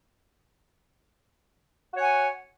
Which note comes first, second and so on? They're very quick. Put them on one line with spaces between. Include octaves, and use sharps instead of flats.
F#4 C#5 F#5 G#5